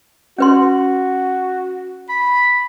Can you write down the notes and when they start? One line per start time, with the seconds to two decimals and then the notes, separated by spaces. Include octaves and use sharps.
0.38 C#4 F#4 B4 C6
2.09 B5